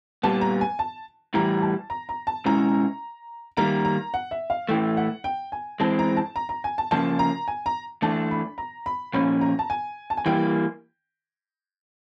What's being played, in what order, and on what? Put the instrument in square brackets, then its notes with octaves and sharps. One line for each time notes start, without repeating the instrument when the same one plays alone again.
[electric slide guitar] A#2 G3 B3 [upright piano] A5
[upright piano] A#5
G#5
A5
[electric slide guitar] A2 E3 G3 [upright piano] A#5
[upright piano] A5
A#5
A#5
A5
[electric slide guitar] B2 G#3 C#4 E4 [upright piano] A#5
[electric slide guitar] D#3 G3 A#3 [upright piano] A#5
[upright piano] A#5
F#5
E5
F5
[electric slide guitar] A2 E3 A3 [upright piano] G5
[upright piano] F#5
G5
G#5
[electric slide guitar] E3 G#3 C4 [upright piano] A5
[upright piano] A#5
A5
A#5
A#5
G#5
A5
[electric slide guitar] C#3 F3 A#3 [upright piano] A5
[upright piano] A#5
G#5
A#5
[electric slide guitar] E3 A3 D4 [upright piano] A5
[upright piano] B5
A#5
B5
[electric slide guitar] A#2 F3 A#3 C#4 [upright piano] B5
[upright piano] A#5
A5
G#5
A5
G#5
[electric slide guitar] E3 G3 A#3 [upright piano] G5